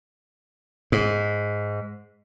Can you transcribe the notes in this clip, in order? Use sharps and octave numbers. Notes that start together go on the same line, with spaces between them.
G#2